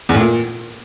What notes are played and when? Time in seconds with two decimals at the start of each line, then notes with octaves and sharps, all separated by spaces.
0.09 E2
0.14 A2
0.20 A#2